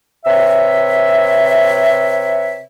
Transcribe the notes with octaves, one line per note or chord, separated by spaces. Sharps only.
C3 B4 C#5 E5